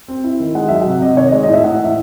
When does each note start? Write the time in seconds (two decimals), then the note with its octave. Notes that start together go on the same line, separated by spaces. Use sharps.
0.08 C4
0.24 E4
0.40 D#3
0.55 G#3 F#5
0.68 F#3 E5
0.82 C3 F#5
1.02 C3 D#5
1.17 D#3 C#5
1.28 D#5
1.33 G#3 C#5
1.43 D#5
1.48 A2 E5
1.64 A2 F#5
1.79 E3
1.84 E5